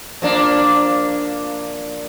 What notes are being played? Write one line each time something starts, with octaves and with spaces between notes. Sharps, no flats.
F3 A#3 D4